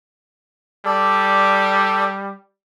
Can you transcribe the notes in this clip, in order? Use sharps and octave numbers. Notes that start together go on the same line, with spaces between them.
G3 A4 D5